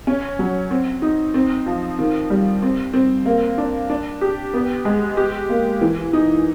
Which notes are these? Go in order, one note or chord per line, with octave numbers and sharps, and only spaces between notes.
C#4
F#3
C4
D#4
C4
F3
D#3
G3
C4
C4
A#3
D4
D4
G4
B3
G#3
G4
A#3
E3
D#4